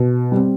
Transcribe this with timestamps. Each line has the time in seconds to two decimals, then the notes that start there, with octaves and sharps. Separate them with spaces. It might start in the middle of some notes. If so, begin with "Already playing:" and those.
Already playing: B2
0.32 G3 C4